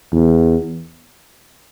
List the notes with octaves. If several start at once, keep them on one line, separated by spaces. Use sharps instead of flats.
E2